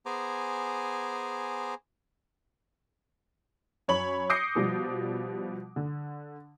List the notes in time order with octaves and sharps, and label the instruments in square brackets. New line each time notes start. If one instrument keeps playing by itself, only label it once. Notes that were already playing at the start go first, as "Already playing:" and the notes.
[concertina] B3 G#4 C5 G#5 A#5 D6
[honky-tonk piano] F#2 C#5 B5 F#7
D6 D#6 G6 A#6 C7 C#7
B2 F3 G3
D3